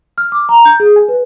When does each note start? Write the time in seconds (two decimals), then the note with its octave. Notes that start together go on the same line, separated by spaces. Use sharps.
0.18 F6
0.32 D6
0.49 A#5
0.65 G6
0.80 G#4
0.96 G#5
1.09 B4